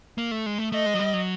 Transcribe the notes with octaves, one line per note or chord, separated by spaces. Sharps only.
A#3
A3
G#3
A3
A3 D#5
G#3
F#3
G3
F#3